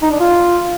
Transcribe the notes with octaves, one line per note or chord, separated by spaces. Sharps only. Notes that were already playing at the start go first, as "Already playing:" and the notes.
D#4
D4
F4